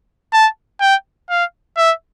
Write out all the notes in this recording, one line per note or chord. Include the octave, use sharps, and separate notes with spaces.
A5
G5
F5
E5